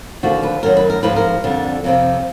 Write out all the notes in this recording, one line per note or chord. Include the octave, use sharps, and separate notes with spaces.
D#2 D3 F3 F#4
B4
F#2 D#3 F#3 A#4
B4
A#4
G#2 F3 B4
A#4
F2 D3 G3
F2 C3 F3